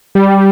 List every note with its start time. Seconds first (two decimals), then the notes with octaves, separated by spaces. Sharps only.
0.15 G3